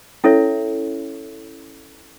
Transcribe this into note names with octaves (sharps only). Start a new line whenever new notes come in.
C#4 E4 A4 C#5 E5